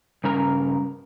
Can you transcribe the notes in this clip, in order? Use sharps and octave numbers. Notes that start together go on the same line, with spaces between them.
G2 C#3 A#4 A#5